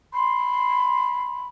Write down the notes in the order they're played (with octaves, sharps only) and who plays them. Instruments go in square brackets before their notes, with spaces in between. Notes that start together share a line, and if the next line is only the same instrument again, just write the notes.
[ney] B5 [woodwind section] C6